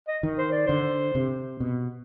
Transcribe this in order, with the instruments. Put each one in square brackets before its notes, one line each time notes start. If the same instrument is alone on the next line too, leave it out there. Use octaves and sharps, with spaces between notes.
[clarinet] D#5
[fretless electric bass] D#3
[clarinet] C5
D5
[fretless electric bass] D3 [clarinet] C5
[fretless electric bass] C3
B2